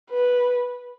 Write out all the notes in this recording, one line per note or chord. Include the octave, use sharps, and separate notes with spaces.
B4